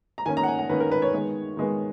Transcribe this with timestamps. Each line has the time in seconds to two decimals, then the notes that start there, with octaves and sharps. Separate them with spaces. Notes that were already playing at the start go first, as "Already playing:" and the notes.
0.18 A#5
0.26 D#3 A#3 C#4 G#5
0.37 A#5
0.43 F#5
0.47 G#5
0.59 F#5
0.69 D#3 A#3 C#4 B4
0.80 A#4
0.92 B4
1.02 C#5
1.13 D#3 G#3 B3
1.57 D#3 G#3 B3